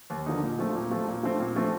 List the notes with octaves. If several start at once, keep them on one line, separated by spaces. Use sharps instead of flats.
D#2
D3 F3 A#3 D#4
A#2
F3 A3 C4
A#2
F3 A3 C4
A#2
F3 A3 C4
A#2
F3 A3 C4